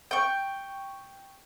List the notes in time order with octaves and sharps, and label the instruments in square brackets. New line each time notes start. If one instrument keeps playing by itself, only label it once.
[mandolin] G5 C#6